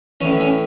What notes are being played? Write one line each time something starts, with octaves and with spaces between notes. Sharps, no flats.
A2 E3 C#4
C#4